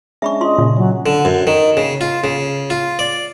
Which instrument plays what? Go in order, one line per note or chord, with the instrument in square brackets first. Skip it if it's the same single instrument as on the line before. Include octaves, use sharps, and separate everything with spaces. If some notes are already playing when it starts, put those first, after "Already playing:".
[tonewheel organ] G#3 C#4 D4 [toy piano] E5 B5 C#6
[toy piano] F4 C6 [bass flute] D#5
[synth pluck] A#2 C#3
[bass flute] F#3 [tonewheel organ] C#4
[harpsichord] D3
F#2
D#3
C#3
F4
C#3
F4
D5